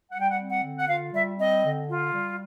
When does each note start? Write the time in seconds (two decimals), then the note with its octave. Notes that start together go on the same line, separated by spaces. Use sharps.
0.11 G3 F#5
0.20 G5
0.30 F#5
0.37 C4
0.49 F#5
0.62 D3
0.79 F#5
0.87 F4 F5
1.12 G3 E5
1.38 C4 D#5
1.63 D3
1.88 F4
2.13 G3